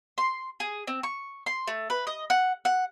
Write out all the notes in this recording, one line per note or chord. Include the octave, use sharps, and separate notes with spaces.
C6
G#4
C4
C#6
C6
A3
B4
D#5
F#5
F#5